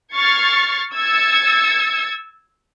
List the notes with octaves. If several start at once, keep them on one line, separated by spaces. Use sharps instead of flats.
C#6 F6 G#6 A6 C7 C#7
E6 G#6 A6 C#7